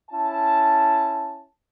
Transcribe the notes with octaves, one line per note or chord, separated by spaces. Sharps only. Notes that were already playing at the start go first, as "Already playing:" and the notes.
C#4 E4 A5